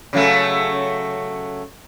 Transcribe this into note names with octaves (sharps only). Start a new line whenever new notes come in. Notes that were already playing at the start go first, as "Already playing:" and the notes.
C#3 F#3 A3